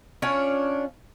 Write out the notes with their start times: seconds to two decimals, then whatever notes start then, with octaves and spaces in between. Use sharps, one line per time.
0.22 C#4 D4 F4 C#5